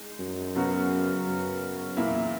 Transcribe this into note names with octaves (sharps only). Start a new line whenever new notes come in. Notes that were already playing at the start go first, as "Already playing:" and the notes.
Already playing: G#3 D#4
F#2
C#3 F#3 B3 F#4
F#2
E2 A#2 A#3 E4